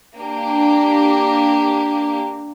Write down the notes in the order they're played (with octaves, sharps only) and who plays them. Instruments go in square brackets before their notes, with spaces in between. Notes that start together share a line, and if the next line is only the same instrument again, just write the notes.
[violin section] A#3 D4 G4